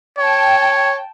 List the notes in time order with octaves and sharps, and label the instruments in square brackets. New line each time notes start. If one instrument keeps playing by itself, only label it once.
[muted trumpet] C#5 [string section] G5 A5